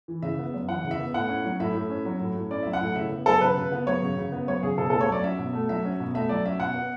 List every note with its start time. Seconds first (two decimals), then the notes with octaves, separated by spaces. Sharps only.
0.08 E3
0.22 C#3 E5
0.39 B3
0.54 F#2
0.69 E3 F#5
0.84 C#3
0.91 E5
0.99 B3
1.14 A2 F#5
1.29 C#4
1.45 F#3
1.60 A2 E5
1.75 A2
1.89 C#4
2.05 F#3
2.20 A2
2.35 A2
2.51 C#4 D5
2.63 F#3 E5
2.73 F#5
2.81 A2
2.96 C#3 E5
3.11 B3
3.26 F#3 A4
3.41 C#3 B4
3.57 C#3
3.72 B3
3.87 F#3 C#5
4.02 C#3
4.17 C#3
4.32 B3
4.47 F#3 C#5
4.63 C#3 G#4
4.78 B2 A4
4.90 A4
4.93 A3
5.01 C#5
5.08 F#3 D5
5.24 C#4 E5
5.39 B2
5.53 A3
5.69 F#3 E5
5.85 C#4
6.00 B2
6.14 A3 E5
6.29 F#3 D5
6.45 C#4 E5
6.60 B2 F#5
6.75 B3